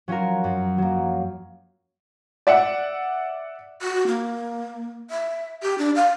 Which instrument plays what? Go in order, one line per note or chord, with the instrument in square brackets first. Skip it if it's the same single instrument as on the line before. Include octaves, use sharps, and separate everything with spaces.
[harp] F#3 C#4 F4 F#4 A#4
F#2
F#3 A#3
[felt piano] D5 E5 F#5
[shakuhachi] F#4
A#3
E5
G4
D4
F5